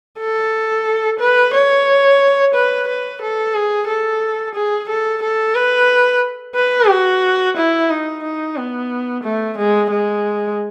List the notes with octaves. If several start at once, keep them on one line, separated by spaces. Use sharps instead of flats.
A4
B4
C#5
B4
B4
A4
G#4
A4
G#4
A4
A4
B4
B4
F#4
E4
D#4
D#4
B3
A3
G#3
G#3